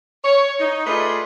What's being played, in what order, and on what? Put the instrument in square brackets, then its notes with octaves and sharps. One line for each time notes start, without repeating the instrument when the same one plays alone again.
[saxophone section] C#5
D#4
A3 F4 G#4 B4 D5 D#5